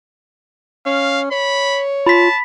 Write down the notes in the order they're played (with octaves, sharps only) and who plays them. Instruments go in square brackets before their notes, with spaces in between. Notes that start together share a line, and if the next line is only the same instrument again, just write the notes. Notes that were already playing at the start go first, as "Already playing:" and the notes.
[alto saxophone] C#4 [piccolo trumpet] F5
[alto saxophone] C#5 [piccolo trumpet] B5
[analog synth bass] F4 [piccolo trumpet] A5 [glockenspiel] B5 B6